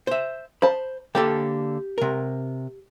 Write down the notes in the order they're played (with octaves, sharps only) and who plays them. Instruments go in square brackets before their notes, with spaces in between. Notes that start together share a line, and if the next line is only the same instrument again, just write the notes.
[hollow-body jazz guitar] C5 E5
[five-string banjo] C5 A5 [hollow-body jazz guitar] B5
[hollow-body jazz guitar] D3 A#3 A4 [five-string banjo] G4
[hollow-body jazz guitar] C3 A#4